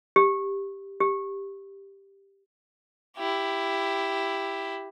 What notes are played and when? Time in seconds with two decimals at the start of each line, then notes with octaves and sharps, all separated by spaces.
0.16 G4
1.00 G4
3.17 E4 G4